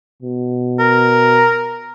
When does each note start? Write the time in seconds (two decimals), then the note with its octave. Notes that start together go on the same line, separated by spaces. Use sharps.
0.23 B2
0.80 A#4